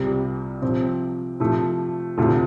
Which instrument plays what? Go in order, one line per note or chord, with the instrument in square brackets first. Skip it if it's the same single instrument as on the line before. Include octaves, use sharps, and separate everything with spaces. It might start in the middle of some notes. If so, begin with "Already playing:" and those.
Already playing: [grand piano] C2 C3 G3 F4
C3 F3 C4
C3 F3 A3
D2 C3 A3 F4